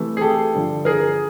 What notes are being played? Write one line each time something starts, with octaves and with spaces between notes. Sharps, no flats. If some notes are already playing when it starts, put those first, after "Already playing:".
Already playing: C3 E3 A3
G#4
G4 A4
G2 D3 F3
G#4 A#4